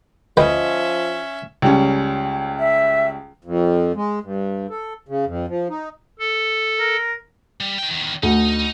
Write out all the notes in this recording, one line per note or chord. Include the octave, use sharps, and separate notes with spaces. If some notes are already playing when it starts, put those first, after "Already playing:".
D2 F3 C#4 B4 D#5 E5 G5
C#2 G3 C#4
E5
F2
G#3
G2
A4
C#3
F2
F3
D#4
A4
A#4
G3
D#4 G5
E2 D#3
D2 D#4